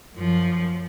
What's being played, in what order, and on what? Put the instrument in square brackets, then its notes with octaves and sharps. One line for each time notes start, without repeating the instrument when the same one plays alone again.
[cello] F#2 F3